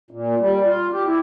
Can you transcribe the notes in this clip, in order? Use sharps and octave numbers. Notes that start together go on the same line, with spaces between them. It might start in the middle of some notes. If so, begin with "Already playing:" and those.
A#2
G3
F4
G4
E4